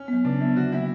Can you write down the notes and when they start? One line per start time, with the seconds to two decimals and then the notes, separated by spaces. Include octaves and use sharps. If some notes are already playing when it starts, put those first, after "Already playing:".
Already playing: C#4
0.08 F#3 B3
0.25 C#3 D4
0.40 F#3 B3 E4
0.56 D3 F#4
0.72 F#3 A#3 E4